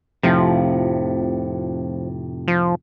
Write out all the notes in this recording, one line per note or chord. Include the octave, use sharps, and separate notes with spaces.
F1 A2 C3 F3
F3